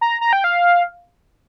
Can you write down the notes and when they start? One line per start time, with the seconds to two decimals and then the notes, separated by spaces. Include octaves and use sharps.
0.01 A#5
0.21 A#5
0.33 G5
0.44 F5